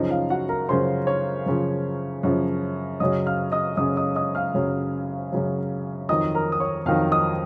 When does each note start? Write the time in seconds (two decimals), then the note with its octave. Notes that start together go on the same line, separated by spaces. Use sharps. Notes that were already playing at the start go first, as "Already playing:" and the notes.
Already playing: F#2 C#3 F3 D#4 D#5
0.10 F4 F5
0.30 F#4 F#5
0.49 A#4 A#5
0.69 F#2 C#3 F3 C5 C6
1.07 C#5 C#6
1.46 F#2 C#3 F3
2.23 F#2 C#3 F3
3.00 F#2 C#3 F#3 D#5 D#6
3.26 F5 F6
3.52 D#5 D#6
3.77 F#2 C#3 F#3 D#5 D#6
3.97 D#5 D#6
4.16 D#5 D#6
4.35 F5 F6
4.54 F#2 C#3 F#3
5.32 F#2 C#3 F#3
6.09 F2 D#3 F#3 D#5 D#6
6.35 A#4 A#5
6.52 D#6
6.60 C#5 C#6
6.86 F2 D#3 F#3 F5 F6
7.11 D#5 D#6